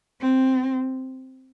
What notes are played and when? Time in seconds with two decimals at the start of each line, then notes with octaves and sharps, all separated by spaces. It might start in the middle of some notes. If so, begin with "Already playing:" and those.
0.21 C4